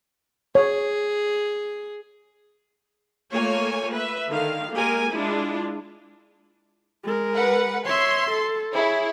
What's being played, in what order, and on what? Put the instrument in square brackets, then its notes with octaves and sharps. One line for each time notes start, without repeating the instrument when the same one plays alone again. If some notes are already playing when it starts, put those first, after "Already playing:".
[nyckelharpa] G#4 [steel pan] C#5
[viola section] A3 A#3 F4 C#5 G#5
B4 E5
D3 D#3 F5
G#3 A#3 G4 A#4 G#5
G#3 D4 E4 F4
[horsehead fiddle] G#3 A#4
[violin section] B4 F#5
[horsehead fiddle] C#5 E5 [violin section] C6
[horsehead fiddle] A4
[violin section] E4 [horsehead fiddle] G#4 C#5